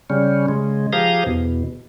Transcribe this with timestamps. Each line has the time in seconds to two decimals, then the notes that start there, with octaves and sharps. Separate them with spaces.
0.10 C#3 G3 C#4
0.48 C#3 G#3
0.93 F3 G4 G#4 F5 A#5 D#6
1.26 E2 B2